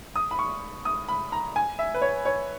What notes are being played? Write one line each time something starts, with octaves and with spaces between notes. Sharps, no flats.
D#6
B5
C#6
D#6
B5
A#5
G#5
E5
B4
C#5
C#5